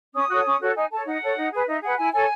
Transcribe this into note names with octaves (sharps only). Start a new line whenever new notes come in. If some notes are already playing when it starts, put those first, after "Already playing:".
C#4 D#6
F#4 A4 C#5
C#4
F#4 A4 C#5
D#4 G#5
A4 C#5 A5
D#4 F#5
A4 C#5
D#4
G#4 B4
D#4 E5
G#4 B4 F#5
E4 G#5
A4 C#5 G#5